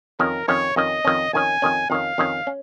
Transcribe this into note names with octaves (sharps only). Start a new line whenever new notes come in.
F2 D#3 C#4 A#4
F2 D#3 C#4 C#5
F2 D#3 C#4 D#5
F2 D#3 C#4
F2 D#3 C#4 G#5
F2 D#3 C#4
F2 D#3 C#4 F5
F2 D#3 C#4
C#4